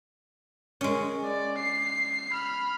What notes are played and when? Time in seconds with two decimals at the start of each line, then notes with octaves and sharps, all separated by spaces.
0.81 G#3 C#4
1.24 D5
1.58 C7
2.32 B5 F6